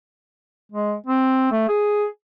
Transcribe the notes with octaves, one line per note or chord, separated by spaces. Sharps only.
G#3
C4
A3
G#4